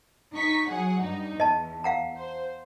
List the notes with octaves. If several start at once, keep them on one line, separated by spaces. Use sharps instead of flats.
D#4 C#6 B6
F#3 G#4 F#5
G2 D#4
E2 D#5 A5
F5 F#5 A#5
C5